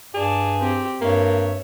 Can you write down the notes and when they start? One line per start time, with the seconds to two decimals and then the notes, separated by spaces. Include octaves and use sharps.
0.14 G2 G#4 D5 A5
0.59 C4 G4
1.01 G2 A#3 C#5 E5